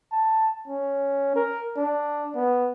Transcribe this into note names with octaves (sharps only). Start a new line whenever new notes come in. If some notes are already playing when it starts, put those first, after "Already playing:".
A5
C#4
A#4
D4
B3